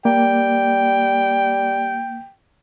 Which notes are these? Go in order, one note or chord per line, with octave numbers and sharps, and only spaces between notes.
G3 A#3 G5